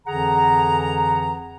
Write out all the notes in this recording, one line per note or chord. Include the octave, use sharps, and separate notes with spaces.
F2 D3 E3 G#4 F#5 A#5